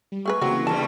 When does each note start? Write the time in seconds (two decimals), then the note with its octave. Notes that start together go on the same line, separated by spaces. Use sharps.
0.12 G3
0.26 A3 G#4 B4 C#6
0.41 C#3 E3 F#3 A#3 C4 F#4
0.67 E2 G2 G3 A5